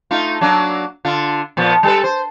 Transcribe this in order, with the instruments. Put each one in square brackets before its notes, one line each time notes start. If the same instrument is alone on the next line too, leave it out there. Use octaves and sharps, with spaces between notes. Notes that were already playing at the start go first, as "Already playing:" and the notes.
[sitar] A3 D#4 F4
F#3 A#3 D4
D3 F4
A#2 F3 B3
G3 A4 B4
C5